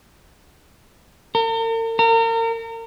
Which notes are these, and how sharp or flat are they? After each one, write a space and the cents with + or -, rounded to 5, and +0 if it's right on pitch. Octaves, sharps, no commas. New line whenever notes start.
A#4 -45
A#4 -35